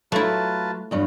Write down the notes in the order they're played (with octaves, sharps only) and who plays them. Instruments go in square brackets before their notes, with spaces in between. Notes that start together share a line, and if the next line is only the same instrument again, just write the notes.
[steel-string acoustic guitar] F#3 [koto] A3 E4 [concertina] F4 B4 A5
[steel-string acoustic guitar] E2 G2 F#3